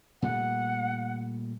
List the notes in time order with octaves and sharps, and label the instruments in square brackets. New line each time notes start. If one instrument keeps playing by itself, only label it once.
[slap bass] A#2 G3 A3 [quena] F#5